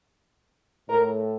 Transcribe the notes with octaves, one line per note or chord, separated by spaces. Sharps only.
A2 A#4